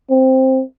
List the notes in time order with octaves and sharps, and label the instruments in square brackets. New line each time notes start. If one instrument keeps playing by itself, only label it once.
[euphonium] C4